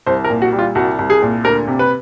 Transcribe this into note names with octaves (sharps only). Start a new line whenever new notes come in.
C2 C5
A#4
A#2
F#4
G3
F4
C2 F#4
C2
G#4
A#2
D2 A#4
C3
B4